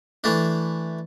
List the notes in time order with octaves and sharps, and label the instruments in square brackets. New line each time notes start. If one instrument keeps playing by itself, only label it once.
[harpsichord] E3 A3 D4